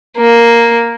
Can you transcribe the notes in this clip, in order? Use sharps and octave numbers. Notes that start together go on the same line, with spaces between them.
A#3